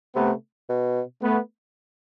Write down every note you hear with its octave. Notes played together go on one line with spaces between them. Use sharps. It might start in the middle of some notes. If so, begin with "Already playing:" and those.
C3 A3 B3
B2
A3 B3